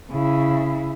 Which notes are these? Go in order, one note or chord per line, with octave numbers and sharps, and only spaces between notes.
C#3 E4